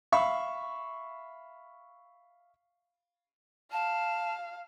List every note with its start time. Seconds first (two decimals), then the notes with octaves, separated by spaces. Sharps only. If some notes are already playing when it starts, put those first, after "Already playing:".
0.12 E5 F5 B5 C#6
3.72 F5 A5